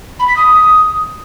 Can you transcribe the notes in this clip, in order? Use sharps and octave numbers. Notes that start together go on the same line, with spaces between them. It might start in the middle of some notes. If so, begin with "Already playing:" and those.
B5
B6
D#6